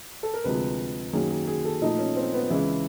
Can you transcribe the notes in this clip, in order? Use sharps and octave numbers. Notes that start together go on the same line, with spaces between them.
A4
A#4
D2 C3 F3 G#3 B4
F#2 D#3 F#3 A#3 G#4
G#4
G#4
A4
A#2 F3 A3 D#4
C#4
C4
B3
C#2 C#3 E3 G#3 E4